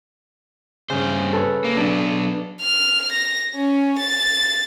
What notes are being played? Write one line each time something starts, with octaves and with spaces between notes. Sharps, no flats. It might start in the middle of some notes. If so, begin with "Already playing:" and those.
G2 C#3 C5
A4 B4 C#5
A#3
F#3 B3 D4
F6
A#6
C#4
A6